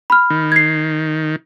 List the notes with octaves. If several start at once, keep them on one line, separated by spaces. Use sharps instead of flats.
B5 F6
D#3
G#6 C7